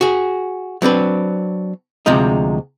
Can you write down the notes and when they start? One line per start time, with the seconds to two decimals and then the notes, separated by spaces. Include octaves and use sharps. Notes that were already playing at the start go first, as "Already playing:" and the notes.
0.01 F#4 G#4
0.82 F#3 C4 D4 B4
2.06 D2 C3 F3 G#3 D#4